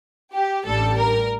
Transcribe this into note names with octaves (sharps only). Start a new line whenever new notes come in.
G4
A1 A2 G3 D4 A4
A#4